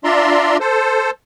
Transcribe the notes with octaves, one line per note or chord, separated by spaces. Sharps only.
D4 F4 D5 E5 A#5 C6
A4 C5